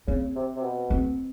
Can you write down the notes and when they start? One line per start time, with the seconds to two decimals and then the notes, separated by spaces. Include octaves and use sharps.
0.07 C#3 C4
0.36 C3
0.56 C3
0.63 B2
0.90 C4